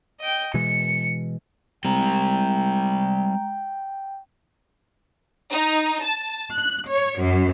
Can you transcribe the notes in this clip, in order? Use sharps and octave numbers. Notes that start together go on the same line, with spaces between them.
D#5 G5
B2 E3 G#3 C#7
G3 G#3 C4 G5 A#5
D#4
A5
F#6
C#5
F#2